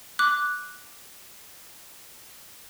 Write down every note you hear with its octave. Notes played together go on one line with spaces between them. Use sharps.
D6 F#6